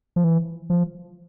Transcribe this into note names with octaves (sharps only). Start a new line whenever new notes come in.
F3
E3
F3